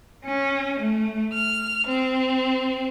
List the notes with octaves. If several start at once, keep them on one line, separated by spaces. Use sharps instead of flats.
C#4
A3
F6
C4